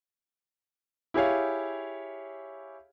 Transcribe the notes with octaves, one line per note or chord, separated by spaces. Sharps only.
E4 G4 G#4 C#5 F5